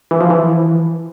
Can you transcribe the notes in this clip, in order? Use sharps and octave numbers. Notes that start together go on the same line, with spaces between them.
E3
F3
E3